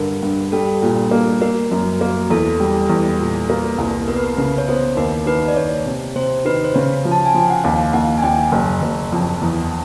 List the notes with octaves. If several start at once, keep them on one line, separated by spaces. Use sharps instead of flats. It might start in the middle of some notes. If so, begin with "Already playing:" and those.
Already playing: G2 D3 A#4
G2
G3 A4
A#2
A#3
A#3 A#4
F#2
A#3
E2 A4
G3
E2
A#2
A#3
C2
B3 A#4
B4
A#4
C#3 B4
C#5
B3 C5
D#2 A#4
D#3 B4
D5
D#2 C#5
C3
C3 C5
D#3 B4
C5
C#3 C#5
F3
A5
G#5
F3 G5
F#5
D#2 F5
D#2 F#5
G#5
D#2 G5
F#1
F#1
F2
E2